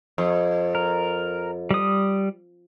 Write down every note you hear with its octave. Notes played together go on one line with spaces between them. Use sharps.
F2
A#4
G3 D#6